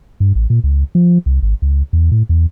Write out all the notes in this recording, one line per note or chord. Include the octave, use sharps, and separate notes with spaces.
G2
A1
A#2
C#2
F3
C2
G#1
C#2
E2
A2
E2